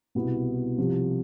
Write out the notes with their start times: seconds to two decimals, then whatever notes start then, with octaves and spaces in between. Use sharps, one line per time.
0.15 C2 B2 B3 E4
0.78 C2 C3 F3